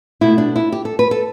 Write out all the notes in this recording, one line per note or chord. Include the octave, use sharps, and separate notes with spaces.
B2 A3 E4
D4
E4
G4
A4
B4
A4